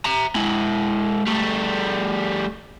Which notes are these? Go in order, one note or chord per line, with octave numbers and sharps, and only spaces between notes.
E5 A#5
G#3 E4
G3 A3